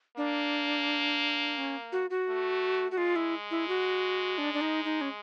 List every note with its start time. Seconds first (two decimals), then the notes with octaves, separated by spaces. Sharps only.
0.17 A#3 D4
1.57 C#4
1.92 F#4
2.10 F#4
2.28 A3
2.91 F#4
2.98 G#3 F4
3.16 E4
3.51 E4
3.68 F#4
4.38 D4
4.54 D4
4.61 D#4
4.85 D#4
5.01 C#4